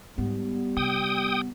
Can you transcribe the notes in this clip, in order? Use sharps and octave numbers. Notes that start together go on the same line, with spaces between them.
G#2 G3 B3
C3 G5 D#6